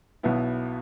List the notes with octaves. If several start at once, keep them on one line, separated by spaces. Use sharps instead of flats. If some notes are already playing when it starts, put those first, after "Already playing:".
B1 B2 B3 E4